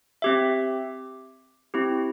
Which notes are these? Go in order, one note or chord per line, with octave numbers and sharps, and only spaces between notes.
C4 G4 E5
C4 E4 G4